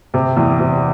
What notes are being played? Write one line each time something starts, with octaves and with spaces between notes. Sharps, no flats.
C3
E2
C3